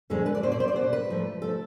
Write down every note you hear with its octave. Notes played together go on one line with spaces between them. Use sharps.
F2 D3 G#3 B3 A4
B4
D5
B2 B3 C5
D5
C5
D5
B2 B3 C5
B4
G#2 F3 A3
F3 A3 A4